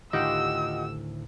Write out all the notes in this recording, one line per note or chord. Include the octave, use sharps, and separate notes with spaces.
D2 A2 D#3 F4 G4 D#5 F#5 E6